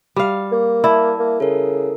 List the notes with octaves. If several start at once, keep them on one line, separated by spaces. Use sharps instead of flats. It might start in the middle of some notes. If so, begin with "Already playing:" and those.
G3 F5
A#3
E4 D5 E5 A5
A#3
C#3 A4 A#4